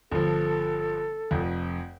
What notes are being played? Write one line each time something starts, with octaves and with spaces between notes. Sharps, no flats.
G1 F3 A4
F1 F2